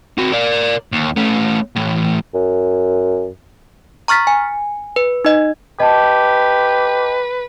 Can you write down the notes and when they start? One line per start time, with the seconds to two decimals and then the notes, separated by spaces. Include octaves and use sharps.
0.18 C4 F#4
0.32 A#4 D5
0.92 D#2
1.16 A3 C#4
1.76 A2 E3
2.34 F#2
4.08 A#5 C#6 F6 A6 B6
4.27 G#5
4.96 B4
5.25 D#4 D#5
5.80 G4 B4 D#5 A5